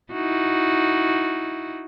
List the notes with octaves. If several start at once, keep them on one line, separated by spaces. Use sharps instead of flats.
D#4 E4 F#4